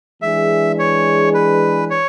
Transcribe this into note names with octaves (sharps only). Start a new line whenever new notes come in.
E3 G#3 D4 G#4 E5
C#5
B4
C#5